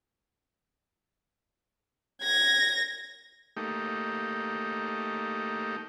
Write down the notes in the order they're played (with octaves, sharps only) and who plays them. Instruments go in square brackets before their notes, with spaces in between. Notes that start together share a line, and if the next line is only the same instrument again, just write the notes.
[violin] G#6 A#6
[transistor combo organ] A3 A#3 D#4 G4